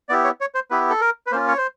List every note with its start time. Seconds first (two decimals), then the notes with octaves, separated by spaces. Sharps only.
0.09 B3 E4 G4 D5
0.24 C#5
0.41 C#5
0.55 C5
0.71 B3 E4 G4 B4
0.90 A4
1.01 A#4
1.27 B4
1.32 A#3 C#4 F4 C5
1.48 C#5
1.57 C5